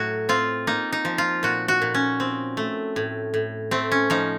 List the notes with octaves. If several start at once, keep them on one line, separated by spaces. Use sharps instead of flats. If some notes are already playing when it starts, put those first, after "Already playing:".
Already playing: A2 F#3 A3 F#4
C4 F4
A#3 D#4
D#4
F3
F4
A#2 F#4
F#4
A#2
C#4
C4
A3
A2
A2
A3 C4
C#4
F3 D#4